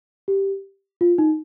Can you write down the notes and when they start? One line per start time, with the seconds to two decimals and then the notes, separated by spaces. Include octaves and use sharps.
0.28 G4
1.01 F4
1.18 D#4